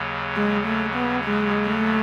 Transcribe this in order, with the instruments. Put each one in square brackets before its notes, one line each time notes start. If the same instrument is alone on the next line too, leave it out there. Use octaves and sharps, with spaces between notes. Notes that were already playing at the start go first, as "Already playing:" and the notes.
Already playing: [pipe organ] D#2 C#3 F#3
[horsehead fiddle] G#3
A3
B3
G#3
A3